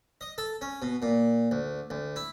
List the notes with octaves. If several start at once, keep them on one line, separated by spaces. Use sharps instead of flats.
D#5
A4
C#4
B2
A#2
D2
D2
E4